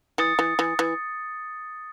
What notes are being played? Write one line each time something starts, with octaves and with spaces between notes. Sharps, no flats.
E3 D#6 A6 C#7
E3
E3
E3